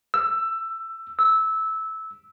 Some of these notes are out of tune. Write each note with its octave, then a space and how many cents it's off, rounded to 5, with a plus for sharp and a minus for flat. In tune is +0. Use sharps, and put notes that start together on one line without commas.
E6 +15
E6 -15